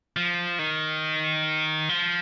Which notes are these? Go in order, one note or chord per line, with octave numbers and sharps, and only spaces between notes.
F3
D#3
F3